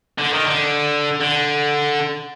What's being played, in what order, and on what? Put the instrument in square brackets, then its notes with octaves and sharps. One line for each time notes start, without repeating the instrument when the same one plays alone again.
[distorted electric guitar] D3
D#3
D3
D3